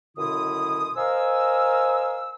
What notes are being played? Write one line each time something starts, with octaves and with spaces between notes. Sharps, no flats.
C#2 F#2 B2 D3 E4 D#6
A#4 C5 D#5 F5 G#5 E6